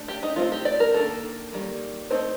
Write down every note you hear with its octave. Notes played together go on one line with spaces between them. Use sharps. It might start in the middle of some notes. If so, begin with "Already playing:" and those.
Already playing: A3 D4
G4
D#4
A3 C4 D#4 F4
G4
D5
A#4
D#3 A#3 D4 A4
D#3 G3 A#3
A3 C4 D#4 C5